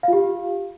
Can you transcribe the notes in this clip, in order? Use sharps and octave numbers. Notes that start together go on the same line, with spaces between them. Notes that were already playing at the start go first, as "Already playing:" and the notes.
F4 G4 F5